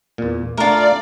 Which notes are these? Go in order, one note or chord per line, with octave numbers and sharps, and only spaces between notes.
E2 A#2
A3 D4 F4 A#4 D5